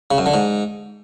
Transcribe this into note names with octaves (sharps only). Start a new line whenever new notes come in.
C#3
F#2
D3
G#2